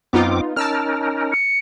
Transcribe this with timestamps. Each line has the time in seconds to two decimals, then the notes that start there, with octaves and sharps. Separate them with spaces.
0.13 F#2 B3 C4 D#4 F4 D6
0.56 C#4 D#4 A#4 A5 E6 F6
1.32 C#7